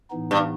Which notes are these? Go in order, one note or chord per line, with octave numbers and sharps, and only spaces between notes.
A2 E3 B3 D#4
G2